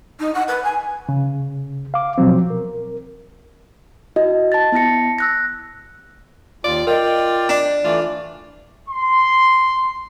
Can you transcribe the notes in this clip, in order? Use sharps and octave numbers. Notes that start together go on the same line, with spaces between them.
D#4
F#5
B4
G#5
C#3
F5 D6
B2 F3 F#3 C4
A#4
E4 F#4 D#5
A5 A6
B3 E4 A5 A#6 C#7
E6 F#6 A#6
D#2 F4 D5
F4 A#4 D5 D#5 G5
D4
E3 A3 F4 D5
C6